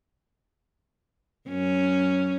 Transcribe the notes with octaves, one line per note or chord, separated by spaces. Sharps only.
F#2 C#4